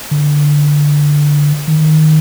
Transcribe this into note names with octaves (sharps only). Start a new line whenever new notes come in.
D3
D#3